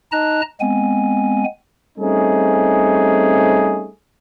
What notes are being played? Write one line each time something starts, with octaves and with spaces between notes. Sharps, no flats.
D#4 D#5 A5 A#5 F#6
G#3 B3 C4 G#5
G3 A3 C4 C#4 D#4 G#4